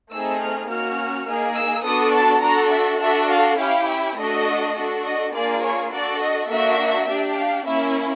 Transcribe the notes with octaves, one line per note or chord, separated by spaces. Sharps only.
A3 C4 D#4 G#4 E6
F6
A#3 C#4 F#4 F6
A#3 D#4 G#4
E6
B3 D4 F#4 A4 D#6
A5
D4 F#4 A4 A#5
E5
D4 F#4 A4 E5
F5
C#4 E4 G4 F5
E5
A3 D4 F#4 A4 D#5
D4 F#4 A4
D#5
A#3 D4 F4 G#4 D5
C#5
D4 F#4 A4 D5
D#5
A#3 D4 F#4 E5
D4 G4
F5
A#3 C#4 E4 E5